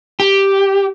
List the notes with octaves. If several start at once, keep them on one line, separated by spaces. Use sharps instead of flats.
G4